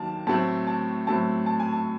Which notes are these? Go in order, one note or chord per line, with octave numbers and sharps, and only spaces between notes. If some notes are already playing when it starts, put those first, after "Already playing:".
Already playing: D#2 D#3 F#3 A#3 A5
A2 F#3 A3 C4 A5
A5
A2 F#3 A3 C4 A5
A5
G#5
A5